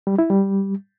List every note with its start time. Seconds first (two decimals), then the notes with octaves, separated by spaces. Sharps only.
0.07 G3
0.19 E4
0.30 G3